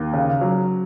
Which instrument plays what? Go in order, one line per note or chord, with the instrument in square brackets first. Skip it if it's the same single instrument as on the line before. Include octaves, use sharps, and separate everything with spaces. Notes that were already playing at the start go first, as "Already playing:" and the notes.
Already playing: [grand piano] D#2
C#3
F#3